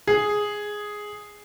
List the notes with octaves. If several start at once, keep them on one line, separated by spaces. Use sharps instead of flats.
G#4